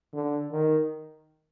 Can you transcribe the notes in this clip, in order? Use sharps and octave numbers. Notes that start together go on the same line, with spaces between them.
D3
D#3